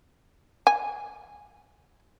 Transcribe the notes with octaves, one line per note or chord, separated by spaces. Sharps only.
G#5